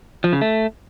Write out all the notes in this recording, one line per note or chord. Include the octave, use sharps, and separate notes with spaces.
F3
C#3
A3